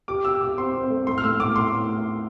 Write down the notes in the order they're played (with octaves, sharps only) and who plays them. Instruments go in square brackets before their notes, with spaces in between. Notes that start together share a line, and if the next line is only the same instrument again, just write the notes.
[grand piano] G4 [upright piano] D6
[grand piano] G4 [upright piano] E6
[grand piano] G4 [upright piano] D6
[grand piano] C4 [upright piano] C6
[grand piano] C4
A3
[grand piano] A2 [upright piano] C6
[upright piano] F6
[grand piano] A2 [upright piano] E6
[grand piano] A2 [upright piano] D6
[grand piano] A2 [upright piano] C6